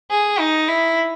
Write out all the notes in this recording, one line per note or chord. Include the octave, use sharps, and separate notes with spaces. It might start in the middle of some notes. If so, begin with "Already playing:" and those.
G#4
D#4
E4